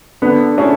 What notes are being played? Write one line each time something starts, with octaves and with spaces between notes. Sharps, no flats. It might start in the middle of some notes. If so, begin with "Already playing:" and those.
D3 B3
A3 C#4 E4 G#4